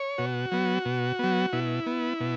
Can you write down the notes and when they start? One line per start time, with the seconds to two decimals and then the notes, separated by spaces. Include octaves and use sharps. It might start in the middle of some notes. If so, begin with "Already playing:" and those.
Already playing: C#5
0.18 B2 F#4
0.52 F#3 B3
0.85 B2
1.19 F#3 B3
1.53 B2 E4
1.86 B3
2.20 B2